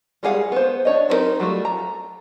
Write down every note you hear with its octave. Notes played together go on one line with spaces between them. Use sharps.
G3 G#3 G#4 F5 F#5
B3 C5
D4 C#5 D#5
F#3 C4 D4 D#4 A#4
F#3 G3 A3 F4
A#5